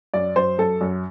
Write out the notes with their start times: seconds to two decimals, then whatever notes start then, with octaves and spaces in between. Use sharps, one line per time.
0.14 F#2 D5
0.36 F#2 C5
0.58 F#2 A4
0.81 F#2